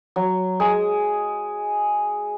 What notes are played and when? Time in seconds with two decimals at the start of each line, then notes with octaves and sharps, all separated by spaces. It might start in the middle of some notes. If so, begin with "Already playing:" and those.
0.16 F#3
0.60 G#3